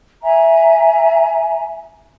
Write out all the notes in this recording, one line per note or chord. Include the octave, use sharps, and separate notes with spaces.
E5 G#5 A#5